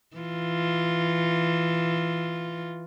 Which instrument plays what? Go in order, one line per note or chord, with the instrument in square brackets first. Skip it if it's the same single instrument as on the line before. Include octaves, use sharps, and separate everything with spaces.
[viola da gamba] E3 F4